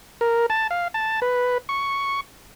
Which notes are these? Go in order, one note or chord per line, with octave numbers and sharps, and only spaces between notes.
A#4
A5
F5
A5
B4
C#6